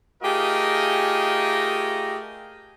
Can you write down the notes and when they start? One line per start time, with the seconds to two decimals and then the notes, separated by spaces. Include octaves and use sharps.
0.22 A3 F4 G4 G#4 A#4 D#5